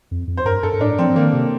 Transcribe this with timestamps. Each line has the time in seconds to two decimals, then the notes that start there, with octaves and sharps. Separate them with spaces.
0.11 F2
0.28 F2
0.37 C5
0.45 G2 A#4
0.63 G2 A4
0.73 G2
0.80 A2 D4
0.98 F3 C4
1.09 F3
1.16 D#3 A#3
1.33 C3